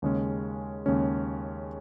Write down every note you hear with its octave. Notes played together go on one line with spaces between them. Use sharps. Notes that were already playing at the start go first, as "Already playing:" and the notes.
D#2 C#3 G#3 C#4
D#2 C#3 G#3 C#4